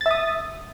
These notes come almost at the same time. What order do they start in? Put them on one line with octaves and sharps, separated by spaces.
A6 E5 D#6